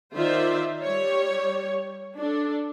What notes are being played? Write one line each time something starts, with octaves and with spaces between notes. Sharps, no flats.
D#3 F4 C5 D5 E5
G3 C#5
D4 A4